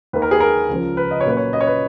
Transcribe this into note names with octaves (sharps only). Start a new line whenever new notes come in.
D#2 D#3 A#3 B4
A#4
G#4
A#4
C#2 C#3 F3
B4
D#5
C#5
A#2 F#3 A#3 C#4 B4
C#5
D#5
C#5
B4